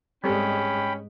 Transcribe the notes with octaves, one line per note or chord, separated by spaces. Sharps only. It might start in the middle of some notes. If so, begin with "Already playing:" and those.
G#2 G3 G#3 C4 C#4 A4 G5 B5